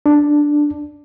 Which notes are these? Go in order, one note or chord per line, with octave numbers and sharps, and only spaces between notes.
D4